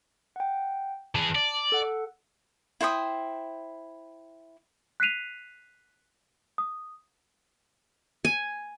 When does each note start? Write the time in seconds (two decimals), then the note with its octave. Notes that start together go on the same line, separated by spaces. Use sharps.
0.36 F#5 G5
1.15 E3 G#4 A5
1.35 D5
1.72 A4 F#5
2.81 E4 C5 G5 D#6
5.00 F#6 B6 C7 D#7 F7
6.58 D#6
8.25 G#5